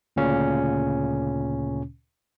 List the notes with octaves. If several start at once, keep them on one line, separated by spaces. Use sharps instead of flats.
D2 A#2 C#3 C#4